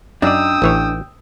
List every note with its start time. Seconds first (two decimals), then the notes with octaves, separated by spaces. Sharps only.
0.22 F#2 D4 D#4 D5 G5 D#6 E6
0.62 A1 E3 C#5